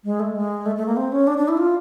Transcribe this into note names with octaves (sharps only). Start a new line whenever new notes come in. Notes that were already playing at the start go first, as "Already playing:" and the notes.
G#3
A3
G#3
A3
A3
A#3
C4
C#4
D4
D4
E4
F4